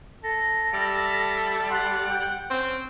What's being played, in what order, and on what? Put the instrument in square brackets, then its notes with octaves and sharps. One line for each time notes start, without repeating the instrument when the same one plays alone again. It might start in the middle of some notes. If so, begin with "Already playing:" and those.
[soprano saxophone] A4 [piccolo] A#6
[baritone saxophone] G3 [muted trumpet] E5
[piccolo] F#5 [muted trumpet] C6
[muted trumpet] G5
[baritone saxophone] C4 [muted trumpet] C#4